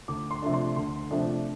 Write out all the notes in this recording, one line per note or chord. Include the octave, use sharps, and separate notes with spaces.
D2 D6
C6
C3 F3 A3 D4
C6
D2 C6
C3 F3 A3 D4